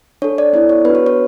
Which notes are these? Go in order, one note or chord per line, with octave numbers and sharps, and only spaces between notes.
D4 A4 C#5
D5
B3 E4 A4 D5
C#5
B3 D4 F#4 B4
C#5
C#5